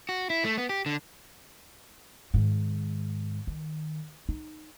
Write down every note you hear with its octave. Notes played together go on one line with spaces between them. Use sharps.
F#4
E4
A3
B3
G4
D3
G#2 D#3
D#3
D#4